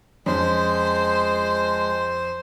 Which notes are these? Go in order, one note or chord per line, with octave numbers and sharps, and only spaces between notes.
F2 G#3 C#4 C5